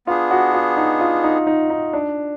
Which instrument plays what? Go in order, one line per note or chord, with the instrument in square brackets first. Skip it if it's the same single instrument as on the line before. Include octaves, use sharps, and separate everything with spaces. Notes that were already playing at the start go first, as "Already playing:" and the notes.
[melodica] B3 D4 G#4 [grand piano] F4
[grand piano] F#4
F4
D#4
F4
D#4
D#4
D#4
D4